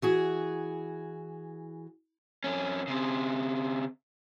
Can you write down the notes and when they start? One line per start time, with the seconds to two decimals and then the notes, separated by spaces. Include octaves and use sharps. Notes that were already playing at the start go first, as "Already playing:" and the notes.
0.02 E3 F#4 G#4
2.44 F2 C#4
2.88 C#3 C4